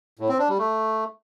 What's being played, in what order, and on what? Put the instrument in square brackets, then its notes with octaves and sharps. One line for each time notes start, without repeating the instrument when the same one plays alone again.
[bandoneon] A2
C4
D4
G3
A3